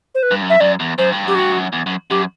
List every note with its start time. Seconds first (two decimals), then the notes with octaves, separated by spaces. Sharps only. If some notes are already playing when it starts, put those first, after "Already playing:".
0.15 C5
0.23 B4
0.31 G2
0.42 F#2
0.50 E5
0.60 F#2 D5
0.80 E2
0.98 F#2 C5
1.12 G2
1.25 F#2 G4
1.35 G2 F#4
1.52 F#2
1.73 E2
1.86 F#2
2.10 F#2 G4